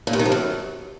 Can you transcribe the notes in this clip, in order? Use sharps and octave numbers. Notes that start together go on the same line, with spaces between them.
A#2
G2
D#3
F3
F#2